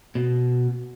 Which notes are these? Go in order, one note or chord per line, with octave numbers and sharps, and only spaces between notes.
B2